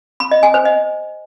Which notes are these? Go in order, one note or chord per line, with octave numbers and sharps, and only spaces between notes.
B5
D#5
G#5
C5
D#5